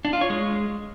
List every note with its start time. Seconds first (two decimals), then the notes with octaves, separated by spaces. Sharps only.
0.05 D4
0.13 F4
0.21 C#5
0.30 G#3